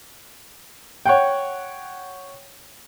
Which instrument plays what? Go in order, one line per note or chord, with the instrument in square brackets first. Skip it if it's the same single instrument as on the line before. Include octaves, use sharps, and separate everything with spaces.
[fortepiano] C#5 F#5 G5